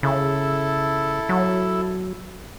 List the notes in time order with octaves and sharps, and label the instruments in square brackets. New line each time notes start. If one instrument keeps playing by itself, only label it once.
[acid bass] C#3 [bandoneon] E4 A4
[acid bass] F#3